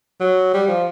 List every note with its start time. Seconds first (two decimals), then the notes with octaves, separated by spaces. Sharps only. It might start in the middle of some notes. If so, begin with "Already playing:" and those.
0.20 F#3
0.54 G3
0.68 F3